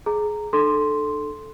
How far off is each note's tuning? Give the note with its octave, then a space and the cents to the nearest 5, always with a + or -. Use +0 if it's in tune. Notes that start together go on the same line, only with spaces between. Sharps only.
G#4 +20 A#5 -15
D4 +45 A4 -10 C6 +0